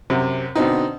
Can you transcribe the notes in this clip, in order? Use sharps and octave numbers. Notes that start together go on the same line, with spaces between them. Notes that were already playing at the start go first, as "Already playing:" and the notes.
F#2 C3
B2 D3 C4 D#4